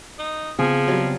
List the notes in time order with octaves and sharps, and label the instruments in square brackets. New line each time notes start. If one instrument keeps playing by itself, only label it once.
[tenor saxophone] D#4
[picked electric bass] C#3 B3 C4 [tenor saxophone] F3 [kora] G#4
[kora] F#3 G3 F4